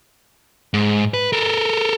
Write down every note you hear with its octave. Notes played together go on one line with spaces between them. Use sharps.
G#2
B4
A4 A#4